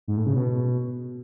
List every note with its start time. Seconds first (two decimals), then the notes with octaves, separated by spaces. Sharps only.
0.08 G#2
0.17 A2
0.26 C#3
0.35 B2